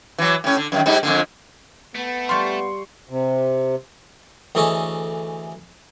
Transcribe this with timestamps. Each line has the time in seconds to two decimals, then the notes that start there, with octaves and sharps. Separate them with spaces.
0.18 E3 F#3
0.44 A2 C#4
0.57 D3
0.72 F#2 C3 D#3
0.86 G#2 G3 D#4
1.03 F2 A#2 D3
1.95 A3 B3
2.29 G3 F4 C6 C#6
3.09 C3
4.55 D2 E3 G#4 A4 C#5 D#5